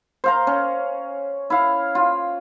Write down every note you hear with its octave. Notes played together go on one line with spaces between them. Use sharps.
C5 F5 A#5
C#4
E4 F5
F4